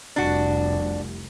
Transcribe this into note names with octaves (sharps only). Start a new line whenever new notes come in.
F1 C2 D4 F#4